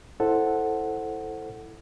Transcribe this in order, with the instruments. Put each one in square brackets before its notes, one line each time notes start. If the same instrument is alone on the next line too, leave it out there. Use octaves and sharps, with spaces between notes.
[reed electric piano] E4 A4 C5 F#5